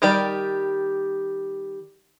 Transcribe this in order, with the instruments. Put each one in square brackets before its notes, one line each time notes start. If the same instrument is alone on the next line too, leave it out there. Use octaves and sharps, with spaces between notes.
[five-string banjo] D#3 G3 G4 A#4 D5